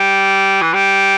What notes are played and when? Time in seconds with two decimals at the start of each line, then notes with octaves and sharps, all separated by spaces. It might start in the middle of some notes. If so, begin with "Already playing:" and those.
Already playing: G3
0.62 E3
0.73 G3